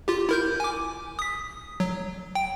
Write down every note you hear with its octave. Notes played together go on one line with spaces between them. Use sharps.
F4 G4
E4 A#4 G6
G#5 D6
D#6 B6
F#3
G5